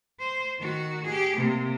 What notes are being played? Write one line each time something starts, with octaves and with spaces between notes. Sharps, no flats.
C5
D#3 F#4
G4 G#4
C3 A#3